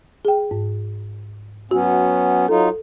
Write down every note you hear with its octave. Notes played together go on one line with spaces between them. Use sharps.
G#4 G5
G#2
F#3 B3 C#4 F#4
F#3 D#4 F4 A4